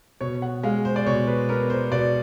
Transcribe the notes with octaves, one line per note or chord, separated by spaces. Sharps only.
B2 C#5
F#5
G#3 F5
C5
D5
B2 C#5
B4
B3 A#4
C5
B2 D5